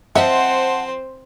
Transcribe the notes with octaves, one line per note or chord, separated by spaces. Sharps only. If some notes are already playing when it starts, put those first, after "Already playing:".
F3 C4 C5 D#5 E5 F#5 A5